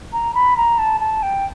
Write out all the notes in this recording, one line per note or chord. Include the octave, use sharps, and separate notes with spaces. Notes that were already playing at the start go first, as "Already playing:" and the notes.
A#5
B5
A#5
A5
A5
G5